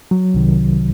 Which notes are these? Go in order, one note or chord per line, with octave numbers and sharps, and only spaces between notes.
F#3
C2 C3 D#3